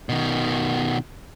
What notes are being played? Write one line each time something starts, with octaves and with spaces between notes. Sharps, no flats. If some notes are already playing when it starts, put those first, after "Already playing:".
B2 D#3